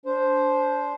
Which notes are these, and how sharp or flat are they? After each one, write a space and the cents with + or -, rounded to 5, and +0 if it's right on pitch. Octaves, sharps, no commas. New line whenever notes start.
D4 -30 C5 +0